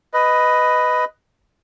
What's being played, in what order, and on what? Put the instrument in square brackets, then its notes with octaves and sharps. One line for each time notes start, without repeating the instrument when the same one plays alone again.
[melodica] B4 D#5